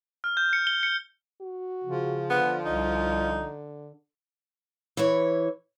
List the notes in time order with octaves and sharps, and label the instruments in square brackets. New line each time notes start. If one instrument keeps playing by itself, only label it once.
[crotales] F6
G6
C#7
G7
C#7
[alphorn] F#4
[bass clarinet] C#3 [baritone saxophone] F3
[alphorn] D3 [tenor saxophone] B3
[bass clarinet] C2 [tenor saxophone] D#4
[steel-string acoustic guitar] E3 E4 C#5